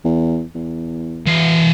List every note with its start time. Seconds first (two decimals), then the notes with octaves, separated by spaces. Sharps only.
0.05 E2
0.55 E2
1.26 E3 F5